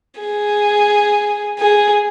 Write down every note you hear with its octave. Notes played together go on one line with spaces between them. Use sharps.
G#4
G#4